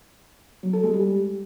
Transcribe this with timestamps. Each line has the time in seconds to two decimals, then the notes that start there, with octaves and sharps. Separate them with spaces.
0.63 F#3
0.73 A4
0.83 G#3
0.94 G3